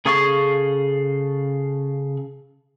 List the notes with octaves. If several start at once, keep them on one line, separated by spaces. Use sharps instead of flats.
C#3 G#4 A4 F5 C#6